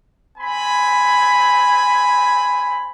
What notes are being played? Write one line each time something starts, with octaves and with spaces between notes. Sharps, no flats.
C4 G#5 B5